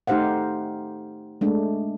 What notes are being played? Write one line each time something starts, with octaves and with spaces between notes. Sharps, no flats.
A3 D#4 G4 C5 F5 F#5
G#3 A3 D4